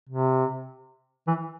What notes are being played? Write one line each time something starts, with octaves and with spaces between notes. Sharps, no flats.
C3
E3